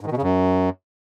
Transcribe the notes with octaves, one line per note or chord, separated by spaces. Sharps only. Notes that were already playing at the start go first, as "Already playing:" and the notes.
G#2
D#3
B2
C#3
F#2